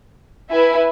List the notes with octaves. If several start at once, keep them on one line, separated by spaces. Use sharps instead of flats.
E4 B4 E5 G#5